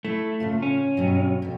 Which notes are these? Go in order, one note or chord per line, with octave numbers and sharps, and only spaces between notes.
A3 E4
A2 C#3 F4
C#4
G2 B2 F#3
F2 B2